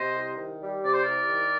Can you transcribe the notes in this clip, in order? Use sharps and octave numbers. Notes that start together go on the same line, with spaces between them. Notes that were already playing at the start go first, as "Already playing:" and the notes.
Already playing: C3 C5 D#5
C2
D#3
G3
C3 D5
C5
C2 A#4 D5
D#3